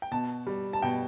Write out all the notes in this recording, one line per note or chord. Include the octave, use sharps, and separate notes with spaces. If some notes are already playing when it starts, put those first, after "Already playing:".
G5
B2 A5
G3
A5
B2 G5